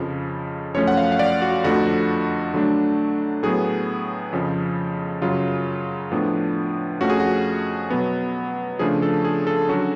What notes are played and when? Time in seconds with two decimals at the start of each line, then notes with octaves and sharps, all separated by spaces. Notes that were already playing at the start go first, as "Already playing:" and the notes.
Already playing: F2 C#3 F3
0.74 F#2 F3 A3 C#4 C#5
0.88 F#5
0.97 F5
1.12 F5
1.19 D5
1.42 F#4
1.64 F2 D3 F3 A3 F#4
2.53 D3 F#3 A3 D4
3.43 A2 F#3 B3 G#4
4.33 F2 C#3 F3
5.22 F#2 C#3 F#3 F4
6.12 A2 F3 B3 D4
7.01 F2 F3 A3 C#4 F#4
7.10 G#4
7.20 F#4
7.90 B2 F#3 B3
8.79 C#3 F3 A3 D4 G#4
9.02 A4
9.24 G#4
9.47 A4
9.69 D3 F#3 C#4 F#4